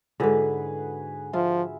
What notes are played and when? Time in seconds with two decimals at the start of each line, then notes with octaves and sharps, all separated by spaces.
0.20 G#2 D3 E4 F#4 G#4 A4 B4
1.33 F3 F4 E5